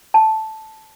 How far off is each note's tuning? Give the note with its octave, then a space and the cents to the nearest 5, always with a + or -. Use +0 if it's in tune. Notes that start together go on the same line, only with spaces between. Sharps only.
A5 -5